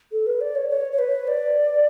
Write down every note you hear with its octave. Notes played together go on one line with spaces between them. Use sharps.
A4
B4
D5
C#5
C#5
C#5
B4
D5